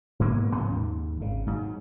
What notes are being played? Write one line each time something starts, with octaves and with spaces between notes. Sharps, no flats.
F#1 G#2 A#3 B3
A2 C#3 F3 C#4
D#2 G#2
G#1 C#3
G#2 F#3